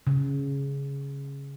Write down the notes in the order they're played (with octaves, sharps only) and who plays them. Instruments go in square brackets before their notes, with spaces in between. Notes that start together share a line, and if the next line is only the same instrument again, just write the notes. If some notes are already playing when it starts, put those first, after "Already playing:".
[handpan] C#3